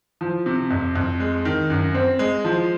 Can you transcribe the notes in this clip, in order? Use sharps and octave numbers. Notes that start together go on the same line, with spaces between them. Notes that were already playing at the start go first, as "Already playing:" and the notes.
F3
C3
F2
F2
G#3
D#3
F#2
C4
G#3
F3